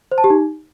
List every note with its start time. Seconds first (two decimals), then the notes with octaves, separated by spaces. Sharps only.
0.12 C5
0.18 A5
0.24 G4
0.30 D#4